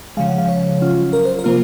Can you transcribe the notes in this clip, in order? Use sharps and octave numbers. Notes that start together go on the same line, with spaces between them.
C#3 F3 G#3 F5
F#5
F5
C#5
F#3 C#4 F4
A#4
C5
A#4
C3 F3 A#3 F4